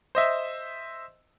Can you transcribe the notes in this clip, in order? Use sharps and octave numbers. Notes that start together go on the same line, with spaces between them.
C5 D#5 E5